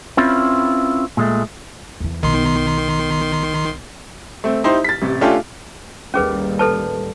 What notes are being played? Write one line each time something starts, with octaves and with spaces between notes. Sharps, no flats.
C4 C#4 E4 F4 B4
A#2 G#3 A3
E2 E3
B1 D#3 B3 C6
A3 C4
D#4 E4 G4 C5
A6 B6
A1 C3
A3 C#4 D4 F4 G4 A4
A1 D#2 G3 C#4 G#4 B4
A4 B4 A5